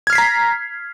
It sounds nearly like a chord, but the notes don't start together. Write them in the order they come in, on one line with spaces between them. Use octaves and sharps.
G#6 F6 C7 B6 A#5